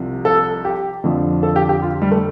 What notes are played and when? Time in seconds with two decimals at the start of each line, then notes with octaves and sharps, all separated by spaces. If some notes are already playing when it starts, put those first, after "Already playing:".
Already playing: C2 C3 F3
0.25 A4
0.65 G4
1.04 F2 D3 F3
1.43 A4
1.56 G4
1.69 G4
1.82 F4
2.02 G3
2.12 A3